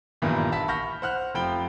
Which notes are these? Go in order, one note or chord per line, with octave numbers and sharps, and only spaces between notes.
G2 A#2 D#3 E3 E4
E5 A5 B5 B6
B5 C#6 F6 G6 A#6
C5 F#5 F6 F#6
F1 F3 G5 B5 G7